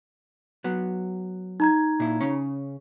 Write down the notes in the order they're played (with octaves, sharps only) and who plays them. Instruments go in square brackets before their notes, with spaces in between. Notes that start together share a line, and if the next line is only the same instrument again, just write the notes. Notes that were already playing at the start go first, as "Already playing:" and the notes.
[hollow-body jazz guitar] F#3 B3
[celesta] D#4 A#5 G#6
[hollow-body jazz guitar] A#2 E4
C#3 C#4